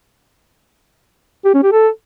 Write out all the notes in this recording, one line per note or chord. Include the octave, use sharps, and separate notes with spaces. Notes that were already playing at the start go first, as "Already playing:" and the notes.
G4
C#4
G4
A4